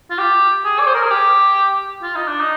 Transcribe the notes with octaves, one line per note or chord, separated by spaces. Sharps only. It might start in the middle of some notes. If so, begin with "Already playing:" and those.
F4
G4
G#4
D5
C5
A#4
G#4
G4
F4
D#4
D4
D#4